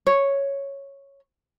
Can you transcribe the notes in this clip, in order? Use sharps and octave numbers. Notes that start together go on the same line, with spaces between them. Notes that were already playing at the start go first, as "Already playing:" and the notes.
C#5